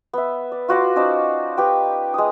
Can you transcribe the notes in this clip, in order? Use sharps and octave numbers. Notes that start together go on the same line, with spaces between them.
B3 E5
D5
F4 F#4 D5 C6
C#4 D#4 C5 D5
G4 B4 G5
G#3 D#6